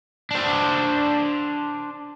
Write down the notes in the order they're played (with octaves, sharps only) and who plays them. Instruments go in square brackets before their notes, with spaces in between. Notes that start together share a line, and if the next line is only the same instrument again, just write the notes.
[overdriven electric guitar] D4 C5